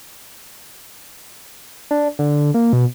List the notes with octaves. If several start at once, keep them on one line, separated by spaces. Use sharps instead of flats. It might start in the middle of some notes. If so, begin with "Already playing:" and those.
D4
D3
A#3
B2